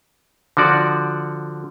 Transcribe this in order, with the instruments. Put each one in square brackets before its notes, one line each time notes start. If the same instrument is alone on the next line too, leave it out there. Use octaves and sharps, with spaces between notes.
[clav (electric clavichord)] D3 F3 F#4 D5